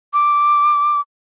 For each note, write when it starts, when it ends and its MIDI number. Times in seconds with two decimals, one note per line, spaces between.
0.13 1.01 86